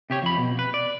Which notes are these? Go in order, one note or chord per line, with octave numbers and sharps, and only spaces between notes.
C3 G4 C#5
F2 B5
B2
B4
D5